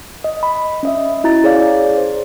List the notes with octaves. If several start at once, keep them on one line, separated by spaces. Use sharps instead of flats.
D#5
B5
C#4 D#5 E5
C#4 E4 F#4 A#5 A6
G#4 C#5 D5 F5
C5